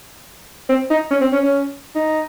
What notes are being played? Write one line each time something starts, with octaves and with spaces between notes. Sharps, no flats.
C4
D#4
C#4
C4
C#4
C#4
D#4